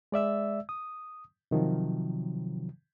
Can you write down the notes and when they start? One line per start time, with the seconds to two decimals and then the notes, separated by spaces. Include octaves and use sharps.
0.12 G#3 D5 E5 E6
0.69 D#6
1.51 C3 D#3 F3 F#3